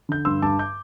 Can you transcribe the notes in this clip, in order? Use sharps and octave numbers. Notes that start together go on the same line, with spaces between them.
D3 G6
G2 C6 E6
G2 A5 D6
D6 G6